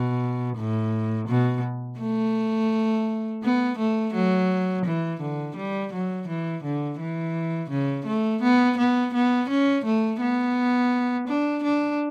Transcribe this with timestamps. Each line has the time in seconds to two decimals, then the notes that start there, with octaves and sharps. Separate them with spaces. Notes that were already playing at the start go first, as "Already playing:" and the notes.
Already playing: B2
0.57 A2
1.28 B2
2.00 A3
3.43 B3
3.78 A3
4.14 F#3
4.85 E3
5.21 D3
5.56 G3
5.93 F#3
6.28 E3
6.63 D3
7.00 E3
7.70 C#3
8.06 A3
8.42 B3
8.77 B3
9.14 B3
9.49 C#4
9.85 A3
10.20 B3
11.28 D4
11.64 D4